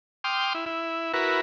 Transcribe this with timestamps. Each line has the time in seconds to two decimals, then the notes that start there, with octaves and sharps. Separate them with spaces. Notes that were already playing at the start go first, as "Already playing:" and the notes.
0.24 G5 C6 D6 D#6 F6
0.55 E4
0.66 E4
1.14 E4 F#4 A#4 B4